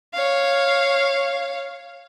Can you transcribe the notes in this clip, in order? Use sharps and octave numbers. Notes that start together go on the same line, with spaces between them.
C#5 F5